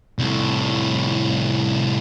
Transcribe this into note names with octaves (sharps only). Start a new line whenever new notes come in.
C2 A2